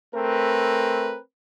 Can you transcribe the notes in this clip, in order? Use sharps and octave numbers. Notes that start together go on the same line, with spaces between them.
A3 C4 A#4 B4